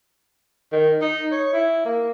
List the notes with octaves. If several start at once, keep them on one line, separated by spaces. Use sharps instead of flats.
D#3
D#4
C#5
E4
A#3